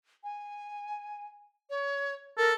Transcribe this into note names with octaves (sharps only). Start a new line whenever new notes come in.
G#5
C#5
A4 A#4